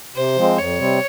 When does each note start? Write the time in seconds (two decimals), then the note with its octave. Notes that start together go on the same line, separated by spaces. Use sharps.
0.16 C3 C5
0.37 F3 G#3 C4
0.58 F2 C#5
0.79 C3 G3 C4